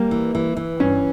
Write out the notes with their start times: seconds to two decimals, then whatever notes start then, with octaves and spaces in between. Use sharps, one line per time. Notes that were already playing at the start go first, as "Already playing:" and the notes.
Already playing: G3 A#3
0.11 E3
0.35 E3
0.57 E3
0.80 G2 C#4